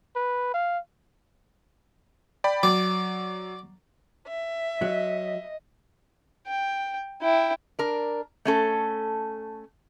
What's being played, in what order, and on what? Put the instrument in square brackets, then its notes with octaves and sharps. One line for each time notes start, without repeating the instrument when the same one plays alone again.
[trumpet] B4
F5
[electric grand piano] D5 G5 B5
[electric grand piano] F#3 [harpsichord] D5
[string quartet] E5
[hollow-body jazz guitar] F#3 [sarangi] D#5
[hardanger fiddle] G5
E4 G5
[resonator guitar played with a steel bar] D4 A#4
A3 C#4 A4